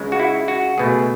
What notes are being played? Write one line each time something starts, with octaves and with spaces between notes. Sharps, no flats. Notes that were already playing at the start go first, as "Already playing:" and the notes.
Already playing: C#2 C#3 G#3
F#4
E4
F#4
C#2 B2 A3 G#4